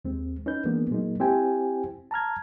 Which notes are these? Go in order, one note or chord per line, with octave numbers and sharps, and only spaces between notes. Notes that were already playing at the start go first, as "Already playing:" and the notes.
D#2 G#3 C4
C#4 D#4 B4 G6
E3 G#3 A#3 B3 D4
A#2 F#3 G#3 A#3 D#4
C4 E4 G4 C5 G5 G#5
A5 A#5 F6 G#6